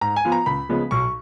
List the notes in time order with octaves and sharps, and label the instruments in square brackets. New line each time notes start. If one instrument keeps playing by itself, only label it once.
[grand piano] G#2 A#5
G#5
F3 B3 F4
A#5
C#2 B5
C#3 F3 G#3 B3
B1 C#6